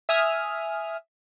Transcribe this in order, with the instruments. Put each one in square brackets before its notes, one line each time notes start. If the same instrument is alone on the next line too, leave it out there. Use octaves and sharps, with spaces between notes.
[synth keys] E5 G#5 D#6 F6